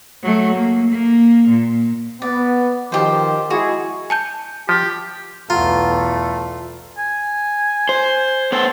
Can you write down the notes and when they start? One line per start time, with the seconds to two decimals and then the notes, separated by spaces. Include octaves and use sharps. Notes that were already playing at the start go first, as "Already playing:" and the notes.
0.23 F#3 A3
0.54 A#3
0.91 A#3
1.48 A#2
2.22 B3 D5
2.92 D#3 F3 G4 C5
3.50 G#3 E4 F#4 G#4
4.10 G#5 A5 G6
4.69 F3 G4
5.50 B1 E2 A3 F4 F5 F#5 A#5
6.98 G#5
7.89 C5
8.52 B3 A4 C5